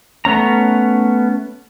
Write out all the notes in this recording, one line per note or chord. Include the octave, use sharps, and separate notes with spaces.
A3 B3 C#4 A#5